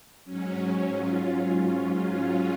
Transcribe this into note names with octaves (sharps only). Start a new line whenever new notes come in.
G#2 F#3 C#4
F4